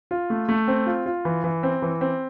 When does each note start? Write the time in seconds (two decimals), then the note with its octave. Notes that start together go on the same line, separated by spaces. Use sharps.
0.11 F4
0.30 A3
0.49 A3
0.68 C4
0.86 F4
1.06 F4
1.25 E3
1.44 E3
1.63 C4
1.82 E3
2.01 C4